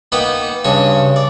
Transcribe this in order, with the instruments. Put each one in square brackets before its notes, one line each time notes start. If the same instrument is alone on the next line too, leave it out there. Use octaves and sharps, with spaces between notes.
[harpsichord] A#3 B3 D#4 B4 F#5 G5
G2 C#3 C#5 C6
D5